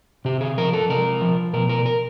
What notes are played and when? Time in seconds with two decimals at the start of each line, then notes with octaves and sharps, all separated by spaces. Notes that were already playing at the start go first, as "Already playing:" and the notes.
0.25 C3 G4
0.41 G#4
0.58 F3 A#4
0.73 A4
0.90 C3 A#4
1.22 F3
1.53 B2 A#4
1.69 A#4
1.86 A#4